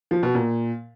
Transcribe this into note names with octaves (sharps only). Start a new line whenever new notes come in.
F3
B2
A#2